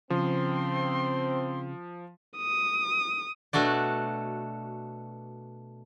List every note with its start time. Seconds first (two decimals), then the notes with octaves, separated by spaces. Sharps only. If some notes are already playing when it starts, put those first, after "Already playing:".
0.10 C#3 F3 C4 C6
2.37 D#6
3.53 B2 A3 D4 F#4 D5